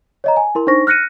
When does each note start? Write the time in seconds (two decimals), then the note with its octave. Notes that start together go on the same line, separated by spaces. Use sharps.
0.24 C#5 D#5 A#5
0.37 G#5
0.55 E4 A#4 C6
0.67 D4 D#4 C5 C#6 A#6
0.87 F6 F#6 A#6 C#7 D#7